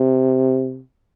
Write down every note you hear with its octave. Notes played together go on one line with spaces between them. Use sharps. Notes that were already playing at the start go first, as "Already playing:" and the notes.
Already playing: C3